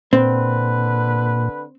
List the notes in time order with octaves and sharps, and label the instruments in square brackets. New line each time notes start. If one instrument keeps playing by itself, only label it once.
[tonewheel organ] A#2 [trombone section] D3 B4 [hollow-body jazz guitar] C4